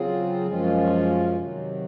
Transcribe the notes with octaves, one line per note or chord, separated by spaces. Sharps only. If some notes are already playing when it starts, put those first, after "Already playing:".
Already playing: C#3 F#3 C4 F4 G#4
F#2 F3 G#3 C#4 F4
C3 D#3 F#3